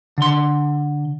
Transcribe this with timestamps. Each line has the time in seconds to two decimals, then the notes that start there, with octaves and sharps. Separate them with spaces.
0.18 D3 C6